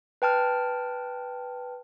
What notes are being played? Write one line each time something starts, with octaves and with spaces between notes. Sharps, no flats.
B4 G5 A5 F6